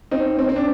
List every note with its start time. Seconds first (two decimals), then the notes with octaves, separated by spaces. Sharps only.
0.11 C4 D#4
0.39 C4
0.49 C4
0.56 D4